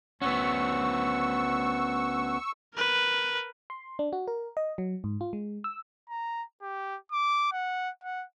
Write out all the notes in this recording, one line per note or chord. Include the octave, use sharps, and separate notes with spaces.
D2 B3 C#4 F#5 C#6 E6
A#4 B4
C6
D4
F#4
A#4
D#5
F#3
G#2
F4
G#3
E6
A#5
G4
D6
F#5
F#5